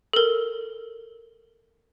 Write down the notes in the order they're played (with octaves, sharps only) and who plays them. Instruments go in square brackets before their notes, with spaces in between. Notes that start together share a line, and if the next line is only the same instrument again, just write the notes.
[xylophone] A4 A#4